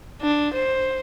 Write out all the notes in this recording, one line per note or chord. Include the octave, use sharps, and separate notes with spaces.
D4
C5